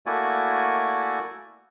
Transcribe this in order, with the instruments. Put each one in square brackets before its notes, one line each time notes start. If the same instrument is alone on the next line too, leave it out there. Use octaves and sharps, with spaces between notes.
[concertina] A3 A#3 E4 F#4 D5 G#5